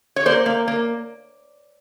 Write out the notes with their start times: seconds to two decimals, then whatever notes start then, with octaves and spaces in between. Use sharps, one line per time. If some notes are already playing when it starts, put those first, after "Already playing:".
0.16 C#5
0.26 A#3 C5 D5
0.46 A#3
0.68 A#3